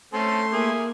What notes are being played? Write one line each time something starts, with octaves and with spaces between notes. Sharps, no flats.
A3 C4 C#4 A4 C6
A#3 E4 G#4